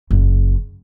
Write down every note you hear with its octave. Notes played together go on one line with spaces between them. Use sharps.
F#1